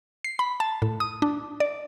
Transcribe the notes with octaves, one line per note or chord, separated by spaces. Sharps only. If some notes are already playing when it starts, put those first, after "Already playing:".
C7
B5
A5
A2
D#6
D4
D5